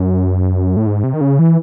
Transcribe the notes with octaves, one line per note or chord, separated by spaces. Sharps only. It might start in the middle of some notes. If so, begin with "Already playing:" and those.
Already playing: F#2
A2
G#2
C3
D#3
C#3
E3